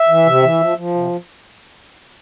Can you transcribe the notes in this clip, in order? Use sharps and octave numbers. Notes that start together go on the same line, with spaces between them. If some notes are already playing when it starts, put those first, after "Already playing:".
Already playing: E5
E3
C3
E3
F3
F3
C3